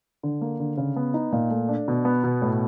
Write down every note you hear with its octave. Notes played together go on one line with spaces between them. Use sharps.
D3
A#3
D3
C#3
B3
D#4
A#2
A3
D4
B2
B3
B2
A2